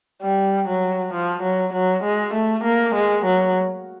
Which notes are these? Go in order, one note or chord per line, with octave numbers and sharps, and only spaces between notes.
G3
F#3
F3
F#3
F#3
G#3
A3
A#3
G#3
F#3